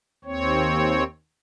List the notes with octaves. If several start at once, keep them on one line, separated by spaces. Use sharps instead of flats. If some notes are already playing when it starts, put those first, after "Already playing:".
D#2 C4 C#5